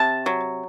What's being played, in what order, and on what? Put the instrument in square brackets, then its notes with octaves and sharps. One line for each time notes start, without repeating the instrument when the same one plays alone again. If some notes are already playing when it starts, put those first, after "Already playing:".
Already playing: [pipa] C3 A5
F#3